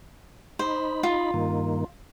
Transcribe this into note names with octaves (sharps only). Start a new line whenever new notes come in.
D#4 C5 B5
F4
G2 D#3 A#3